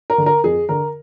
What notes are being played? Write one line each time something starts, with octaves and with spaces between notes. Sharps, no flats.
A#4
D3
A#4
F2 G#4
D3 A#4